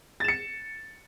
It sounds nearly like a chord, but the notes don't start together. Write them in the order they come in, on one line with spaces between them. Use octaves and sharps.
A6 E7 C#7